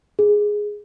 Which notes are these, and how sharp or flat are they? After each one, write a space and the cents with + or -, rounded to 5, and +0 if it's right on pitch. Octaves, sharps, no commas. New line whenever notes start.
G#4 +0